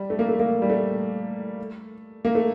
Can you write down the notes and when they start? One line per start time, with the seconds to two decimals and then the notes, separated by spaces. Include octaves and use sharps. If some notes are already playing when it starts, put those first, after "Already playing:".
Already playing: G3
0.10 A3
0.19 A#3
0.28 A3
0.39 A#3
0.62 G3
0.70 A3
2.25 A#3
2.35 A3